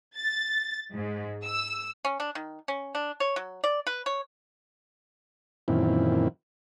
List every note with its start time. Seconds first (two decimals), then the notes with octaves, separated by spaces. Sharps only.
0.14 A6
0.94 G#2
1.45 E6
2.05 C#4
2.20 D4
2.35 D#3
2.68 C#4
2.95 D4
3.20 C#5
3.36 F#3
3.64 D5
3.87 B4
4.06 C#5
5.68 F#2 A#2 D#3 E3 C4 E4